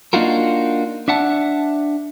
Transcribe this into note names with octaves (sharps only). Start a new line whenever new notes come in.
A#3 D4 D#4 F4 F#4 A#4
D4 E5 F#5 A5